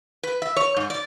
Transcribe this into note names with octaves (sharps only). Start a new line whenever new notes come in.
B4
E5
C#5
G#2
D5